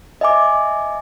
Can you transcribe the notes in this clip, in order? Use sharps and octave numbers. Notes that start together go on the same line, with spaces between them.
D#5 E5 G#5 D6